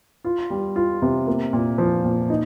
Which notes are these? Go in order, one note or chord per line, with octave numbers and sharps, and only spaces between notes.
F4
G3
F4
C3
A#3
A#2
F3
A#2
D#4